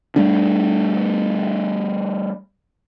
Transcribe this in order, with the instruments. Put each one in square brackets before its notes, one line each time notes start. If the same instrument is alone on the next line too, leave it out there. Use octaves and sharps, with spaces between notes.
[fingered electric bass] G3 A3 D4